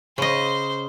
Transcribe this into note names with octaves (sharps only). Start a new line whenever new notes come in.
C#3 C5 D#5